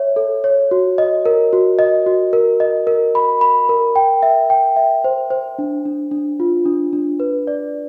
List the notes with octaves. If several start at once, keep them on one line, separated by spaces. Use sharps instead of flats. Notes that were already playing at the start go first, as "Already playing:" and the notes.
Already playing: C#5 E5
A4
C#5
F#4
D#5
A#4
F#4
D#5
F#4
A#4
D#5
A#4
B5
B5
A#4
G5
E5
G5
E5
C5
C5
D4
D4
D4
F4
D4
D4
B4
D5